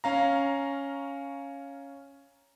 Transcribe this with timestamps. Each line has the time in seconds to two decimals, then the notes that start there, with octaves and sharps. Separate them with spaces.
0.04 C#4 F5 A#5